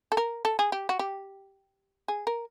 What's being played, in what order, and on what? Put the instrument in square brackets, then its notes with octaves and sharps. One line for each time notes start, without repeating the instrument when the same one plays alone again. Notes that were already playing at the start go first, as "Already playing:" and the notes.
[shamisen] A4
A#4
A4
G#4
G4
F#4
G4
G#4
A#4